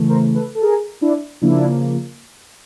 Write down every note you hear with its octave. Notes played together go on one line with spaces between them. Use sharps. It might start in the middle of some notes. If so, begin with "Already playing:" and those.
Already playing: C#3 E3 A3
A#4 C5
A4 B4
A4
G#4 A#4
D4 E4
C#3 F3 A#3 D4 E4